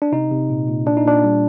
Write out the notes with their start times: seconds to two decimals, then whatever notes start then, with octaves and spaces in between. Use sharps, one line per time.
0.02 D4
0.12 C3 D#4
0.31 C3
0.50 A#2
0.68 A#2
0.86 A#2 D4
0.97 D#4
1.05 A#2 D4
1.24 G3